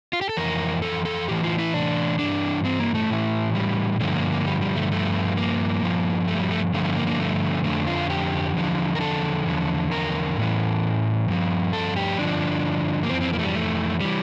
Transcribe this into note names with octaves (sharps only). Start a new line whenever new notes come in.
F4
G4
A4
F2 E3 A#4
A4
A4
A2 E3 G4
F4
E4
D4
G2 E3 D4
C4
A#3
A3
A2 E3
G3
G2 D3 F3 A3
A#3
A#3
G3
G3
A3
G2 F3 A3
A#3
G2 F3
A3
G3
A3
G2 D3 F3 A3
A3
A#3
A#3
A3
F2 D3 F3 A3
F4
G4
E2 D3 F3
A#4
A4
E2 D3 F3
A#4
A2 E3
G2 F3
A4
G4
G2 D3 F3 D4
A#3
F2 E3 C4
C4
A#3
A3
G3
A3
E3 G3